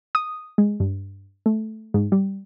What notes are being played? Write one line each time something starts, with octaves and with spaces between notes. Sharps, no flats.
D#6
G#3
G2
A3
G#2
G3